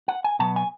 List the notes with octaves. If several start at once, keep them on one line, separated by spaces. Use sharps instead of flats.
F#5
G#5
B2 F#3 B3 A5
G#5